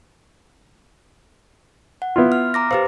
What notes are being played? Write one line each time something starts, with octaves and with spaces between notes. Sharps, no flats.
F#5
B3 E4 F4
F6
A#5 D6 A#6
G4 B4 C5 F5